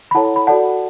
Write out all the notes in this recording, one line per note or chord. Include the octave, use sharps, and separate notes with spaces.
B5
E4 A4 C#5 F#5 A5
B5
F#4 A4 D5 F#5 A5